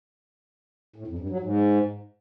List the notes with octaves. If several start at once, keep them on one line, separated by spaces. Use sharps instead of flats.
A2
F2
G2
F#3
G#2